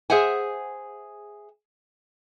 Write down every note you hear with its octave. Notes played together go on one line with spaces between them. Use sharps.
G#4 C5 E5 F#5 G#5